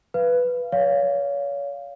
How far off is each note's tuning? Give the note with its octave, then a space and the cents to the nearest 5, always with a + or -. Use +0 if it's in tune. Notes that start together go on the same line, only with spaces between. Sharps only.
B4 +0 F5 -30
C#5 +35 F5 +0